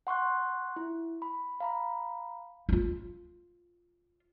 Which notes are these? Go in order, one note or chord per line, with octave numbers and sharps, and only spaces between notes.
F#5 C6 C#6 F#6
E4
B5
F5 A#5 B5
D#4 F4